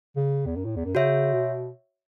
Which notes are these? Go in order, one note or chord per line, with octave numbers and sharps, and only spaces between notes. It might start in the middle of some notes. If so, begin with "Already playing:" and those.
C#3
E2
F#2
A2
E2
F#2
C#3 F#4 C#5 E5
B2